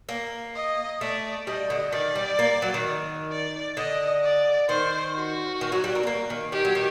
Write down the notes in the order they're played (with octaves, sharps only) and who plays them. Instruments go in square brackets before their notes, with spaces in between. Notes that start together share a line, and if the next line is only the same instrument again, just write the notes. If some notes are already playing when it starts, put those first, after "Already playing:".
[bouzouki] A#3
[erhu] D#5
[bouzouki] A3 [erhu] D5
[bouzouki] G3 [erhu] D#5
[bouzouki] D3
[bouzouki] D#3 [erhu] D5
[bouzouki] G3
A#3
F#3
D#3
[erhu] D5
[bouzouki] D3 [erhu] D#5
[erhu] D5
[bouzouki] D#3 [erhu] C5
[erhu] F#4
[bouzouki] D#3
F#3
G3
A#3
C4
A#3
D#3
[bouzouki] D#3 [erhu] G4
[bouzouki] F#3
D#3